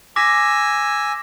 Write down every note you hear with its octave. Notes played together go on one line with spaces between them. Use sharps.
G#5 D6 E6 A#6 B6